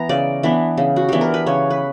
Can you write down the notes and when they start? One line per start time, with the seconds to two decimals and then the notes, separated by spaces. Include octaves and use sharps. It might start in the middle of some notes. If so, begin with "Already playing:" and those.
Already playing: E3 B3 A#5
0.09 C#3 D5
0.43 E3 B3 D4
0.78 C#3
0.96 F#4
1.09 E3 B3 D4 G4
1.21 A#4
1.34 B4
1.46 C#3 C#5
1.70 B4